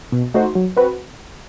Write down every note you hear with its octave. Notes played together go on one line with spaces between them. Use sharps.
B2
A3 D#4 F#4 C5
F#3
C4 F#4 B4